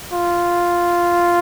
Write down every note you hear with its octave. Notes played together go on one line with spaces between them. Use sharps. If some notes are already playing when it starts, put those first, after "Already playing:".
F4